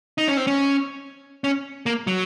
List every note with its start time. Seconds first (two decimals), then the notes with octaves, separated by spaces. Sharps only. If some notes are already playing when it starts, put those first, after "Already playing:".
0.18 D#4
0.28 C#4
0.37 C4
0.47 C#4
1.44 C#4
1.86 A#3
2.07 F#3